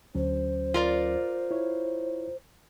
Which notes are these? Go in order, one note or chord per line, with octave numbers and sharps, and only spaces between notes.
D2 F#3 C#4 C5
F4 A#4 D5
E4 C#5